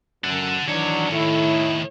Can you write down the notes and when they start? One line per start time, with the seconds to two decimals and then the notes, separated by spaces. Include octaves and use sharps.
0.24 F#2 A4 F#5
0.68 D#3 E3 F#3 D4 C#5
1.11 A2 E4